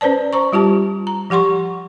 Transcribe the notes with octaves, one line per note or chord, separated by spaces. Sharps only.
C#4 B4 C5 D5 A5
C5 A#5 C#6
G3 F4 G4 A5
A#5
F3 G4 F#5 C6 C#6